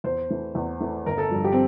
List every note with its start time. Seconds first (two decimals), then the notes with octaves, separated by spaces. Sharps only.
0.04 E2 C5
0.30 E3 A3
0.55 E2
0.80 E3 A3
1.06 G1 A#4
1.18 A4
1.31 G2 F3
1.44 G4
1.52 C4